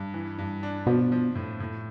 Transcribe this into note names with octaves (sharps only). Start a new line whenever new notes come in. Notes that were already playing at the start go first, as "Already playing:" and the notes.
Already playing: G2
E3
G2
D4
B2 F3
F3
A2
A2